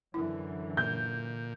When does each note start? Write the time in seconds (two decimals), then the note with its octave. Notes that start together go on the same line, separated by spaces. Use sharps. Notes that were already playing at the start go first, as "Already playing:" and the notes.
0.14 F#2 D3 E3 E4
0.77 A#2 G6